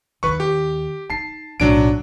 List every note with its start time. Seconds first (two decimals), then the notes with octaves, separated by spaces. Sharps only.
0.23 D#2 D#3 B4 C#6
0.40 G4
1.10 D#4 A5 C7
1.60 B1 A2 F#3 D4 D7